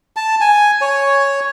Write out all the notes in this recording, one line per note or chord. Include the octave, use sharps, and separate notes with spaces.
A5
G#5
C#5